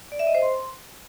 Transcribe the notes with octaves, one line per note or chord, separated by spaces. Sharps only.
D5
E5
D#5
C5
C6